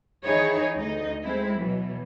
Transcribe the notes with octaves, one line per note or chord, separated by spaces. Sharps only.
D#3 E3 D#4 E4 G#4 C#5
D2 D#4 D#5
G#3 C4 E4
B2 E3 F#3